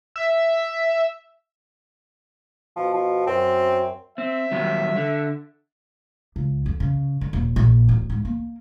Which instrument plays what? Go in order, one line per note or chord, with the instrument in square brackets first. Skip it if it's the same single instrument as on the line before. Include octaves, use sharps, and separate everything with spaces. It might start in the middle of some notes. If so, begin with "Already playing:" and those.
[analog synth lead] E5
[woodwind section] B2 [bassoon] F3
[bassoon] F3
[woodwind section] F#2 [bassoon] C4
[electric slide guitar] C4 [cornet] E5
[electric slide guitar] D#3 F#3 G3
D3
[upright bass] C#2
F2
C#3
D3
D#1
A#1
D1
G#2
A#3